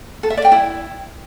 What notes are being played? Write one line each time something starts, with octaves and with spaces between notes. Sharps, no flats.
A4
E5
D5
G5
E4